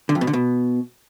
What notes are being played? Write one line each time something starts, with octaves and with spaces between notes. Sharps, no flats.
D3
F2
B2
D3
B2